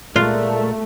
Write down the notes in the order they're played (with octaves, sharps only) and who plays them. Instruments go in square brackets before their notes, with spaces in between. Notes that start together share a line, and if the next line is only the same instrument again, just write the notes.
[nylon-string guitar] A#2 G#3 [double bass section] A3 [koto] F4 [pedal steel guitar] A#4 D5 F#6